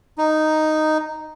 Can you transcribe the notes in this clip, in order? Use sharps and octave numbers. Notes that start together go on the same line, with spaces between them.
D#4